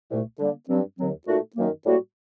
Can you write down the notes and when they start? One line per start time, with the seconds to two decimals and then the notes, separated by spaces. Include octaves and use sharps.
0.10 C2 A#2 A3
0.39 D3 G3 A#3
0.68 G2 F#3 C4
0.98 D#2 D3 F#3 C4
1.27 A#2 A3 D#4 F#4
1.56 F#2 D#3 F#3 A#3
1.85 A2 G3 A#3 F#4